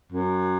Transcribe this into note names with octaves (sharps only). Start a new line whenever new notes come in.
F#2